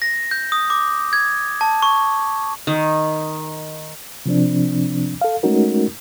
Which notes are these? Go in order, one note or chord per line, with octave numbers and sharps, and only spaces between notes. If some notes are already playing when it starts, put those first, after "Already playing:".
A#6
G6
D#6
D6
G#6
A5
C#6
D#3
C3 F3 C4 D4
A4 F5
G#3 A3 C#4 D#4 F#4 A#4